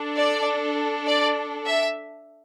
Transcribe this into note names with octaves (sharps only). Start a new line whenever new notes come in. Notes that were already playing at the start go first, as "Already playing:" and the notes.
Already playing: D4 A4
D5
D5
E5